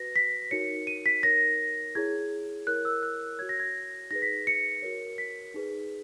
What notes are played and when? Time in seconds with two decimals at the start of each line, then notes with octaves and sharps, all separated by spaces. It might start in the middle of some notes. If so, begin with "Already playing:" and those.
Already playing: F#4 B4 A#6
0.16 B6
0.51 D#4 F#4 A#4 C#5 C#7
0.87 D#7
1.06 B6
1.23 D#4 A#4 C#5 A#6
1.95 E4 G#4 C#5 G#6
2.67 E4 A#4 C#5 F#6
2.85 E6
3.03 F#6
3.39 F#4 C#5 G#6
3.49 A#6
3.60 G#6
4.11 D#4 G#4 B4 A#6
4.22 B6
4.47 C#7
4.82 F#4 A#4 C#5
5.18 B6
5.54 D#4 G#4 B4